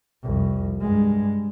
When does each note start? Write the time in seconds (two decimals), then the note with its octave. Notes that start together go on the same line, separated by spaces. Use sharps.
0.23 C2 F2
0.80 G2 G#3